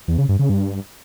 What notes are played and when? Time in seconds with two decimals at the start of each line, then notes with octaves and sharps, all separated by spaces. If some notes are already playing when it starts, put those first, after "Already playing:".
0.08 E2
0.18 C#3
0.29 G2
0.39 C#3
0.49 G2